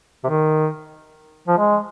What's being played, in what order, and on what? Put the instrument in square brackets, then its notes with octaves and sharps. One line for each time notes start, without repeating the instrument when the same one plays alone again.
[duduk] C3
D#3
F3
G#3